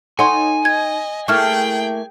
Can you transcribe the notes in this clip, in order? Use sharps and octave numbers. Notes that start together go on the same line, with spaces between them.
D#4 A4 C#5 F#5 G#5 C6
D#5 G#6
A3 A#3 E4 G#4 G5 C#6 F6